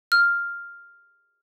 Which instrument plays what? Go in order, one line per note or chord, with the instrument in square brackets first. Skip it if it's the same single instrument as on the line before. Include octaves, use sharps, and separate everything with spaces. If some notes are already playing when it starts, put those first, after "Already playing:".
[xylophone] F6